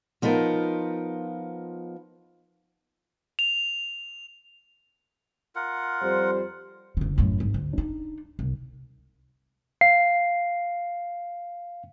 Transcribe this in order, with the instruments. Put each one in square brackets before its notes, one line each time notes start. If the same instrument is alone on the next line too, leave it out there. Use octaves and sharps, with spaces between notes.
[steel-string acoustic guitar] F3 B3 D#4 F4 A#4
[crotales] F7
[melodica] F4 A#4 F#5
[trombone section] F2 G3 C5
[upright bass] F#1 D3
F#2 A2
G#1
D2
D4 D#4
C2
[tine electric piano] F5 C7